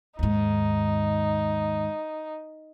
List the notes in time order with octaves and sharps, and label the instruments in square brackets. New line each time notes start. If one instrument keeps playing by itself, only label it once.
[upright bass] D#2 G#2 [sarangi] D#4